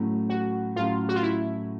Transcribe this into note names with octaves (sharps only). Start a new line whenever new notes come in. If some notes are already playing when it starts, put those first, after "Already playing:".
Already playing: A2 F#3 A3 C#4
F#4
A2 F#3 A3 C#4 F4
F#4
F4
E4